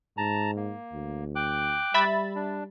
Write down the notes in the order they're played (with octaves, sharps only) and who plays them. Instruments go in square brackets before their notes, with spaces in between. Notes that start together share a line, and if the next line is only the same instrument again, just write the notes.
[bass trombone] G#2 [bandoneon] A5 A#5
[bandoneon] A#3
[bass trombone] D2
[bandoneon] G5 D6 F#6
[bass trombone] G3 [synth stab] E5 B5 A6
[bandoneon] D4